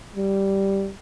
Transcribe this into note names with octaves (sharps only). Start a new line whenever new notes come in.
G3